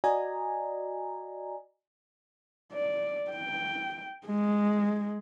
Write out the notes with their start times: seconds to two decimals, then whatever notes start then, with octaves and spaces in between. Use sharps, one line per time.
0.04 F#4 D5 D#5 G#5 A#5
2.73 D5
3.30 G5
4.26 G#3